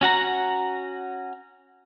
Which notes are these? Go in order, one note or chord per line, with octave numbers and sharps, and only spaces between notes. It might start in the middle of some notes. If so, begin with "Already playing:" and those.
C#4 F#4 F#5 A#5